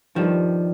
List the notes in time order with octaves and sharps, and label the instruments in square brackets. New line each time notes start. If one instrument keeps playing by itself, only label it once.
[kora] G2 D#3 G3 [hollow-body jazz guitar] F3